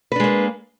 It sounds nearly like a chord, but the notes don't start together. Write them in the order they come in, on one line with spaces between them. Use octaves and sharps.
B4 D4 G#3 A#3